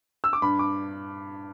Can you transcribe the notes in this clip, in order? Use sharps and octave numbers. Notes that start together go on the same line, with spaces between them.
E6
D6
G2 B5
D6